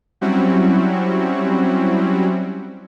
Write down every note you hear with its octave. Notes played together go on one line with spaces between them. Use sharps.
F#3 G3 C4 C#4 E4 F#4